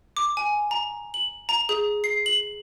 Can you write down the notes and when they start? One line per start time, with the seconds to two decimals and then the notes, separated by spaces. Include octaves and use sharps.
0.17 D6
0.37 G#5
0.71 A#5
1.14 F#7
1.49 A#5
1.69 G#4
2.04 C7
2.26 F#7